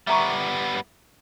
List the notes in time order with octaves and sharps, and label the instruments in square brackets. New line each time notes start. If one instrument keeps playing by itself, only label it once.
[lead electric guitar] G3 B3 [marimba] E5 A#5 C#6